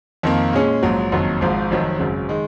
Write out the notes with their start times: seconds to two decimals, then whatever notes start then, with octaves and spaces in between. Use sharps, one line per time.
0.23 F2 D#3 A#3
0.53 A#2 G#3 C#4 G#4
0.83 A#1 G#2 F#3
1.12 F#1 F2 D#3 F#3
1.41 G#1 G#2 F3
1.71 F1 F2 D#3 F#3 C4
1.99 G#1 F#2 C#3
2.29 D#3 G#3 D#4